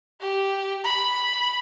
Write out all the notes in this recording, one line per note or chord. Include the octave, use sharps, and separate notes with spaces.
G4
B5